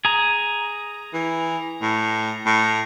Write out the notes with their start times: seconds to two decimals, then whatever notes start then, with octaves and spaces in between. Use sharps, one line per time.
0.05 G#4 A#5
1.14 E3
1.82 A2
2.46 A2